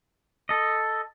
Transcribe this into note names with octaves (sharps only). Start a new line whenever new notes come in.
A4 D#5